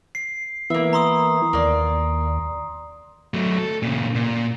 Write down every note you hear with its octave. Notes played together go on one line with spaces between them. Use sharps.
C7
E3 A#3 B3 E4 E5
A#5 C6 D#6
D#2 A#3 D5
F#3 A3
A4
A#2 C#3
A#2